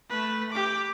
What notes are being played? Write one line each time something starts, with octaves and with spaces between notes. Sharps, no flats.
A3 B4
G4 D6